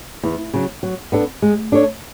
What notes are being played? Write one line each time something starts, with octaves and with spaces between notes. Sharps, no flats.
E2
C#3 F#3
F#3
B3 D4 A4
G#3
D4 A4 C#5